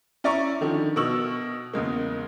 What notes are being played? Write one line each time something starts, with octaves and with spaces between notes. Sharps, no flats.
C#4 E4 D5 E5 A#5 C#6
D3 D#3 F3
B2 A#4 C#6 E6 F#7
E2 C#3 G#3 A#3